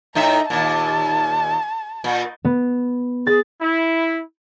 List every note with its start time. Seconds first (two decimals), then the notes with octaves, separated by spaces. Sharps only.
0.15 A2 D#4 E5 A#5
0.50 D#2 A#2 A5
2.04 A#2
2.45 B3
3.27 G#4 A6
3.61 E4